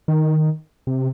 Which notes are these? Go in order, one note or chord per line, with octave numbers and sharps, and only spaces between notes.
D#3
C3